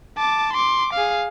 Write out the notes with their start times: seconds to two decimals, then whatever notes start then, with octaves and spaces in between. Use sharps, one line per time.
0.18 A5 D6
0.53 C6 D6
0.93 G#4 F5